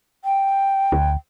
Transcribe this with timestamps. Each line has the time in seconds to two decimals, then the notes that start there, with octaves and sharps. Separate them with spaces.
0.25 G5
0.92 D2